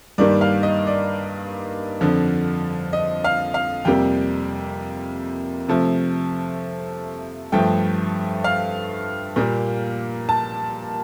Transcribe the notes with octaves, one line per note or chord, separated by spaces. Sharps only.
G2 D#3 G3 A#3 D5
F5
D#5
D5
F2 D3 F3
D#5
F5
F5
F2 C3 G3 A#3 G5
C3 F3 A3
G2 F3 A3 G5
F5
A#2 G3 A#3
A5